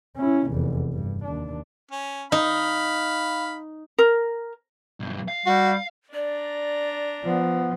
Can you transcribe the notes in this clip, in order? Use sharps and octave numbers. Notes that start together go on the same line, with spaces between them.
C#4 E4
F1 E2
G2
D#2 D4
C#4
D#4 F5 B5
A#4
B1 G2
F5
G3 F#4
D4 D5 A#5
F3 B3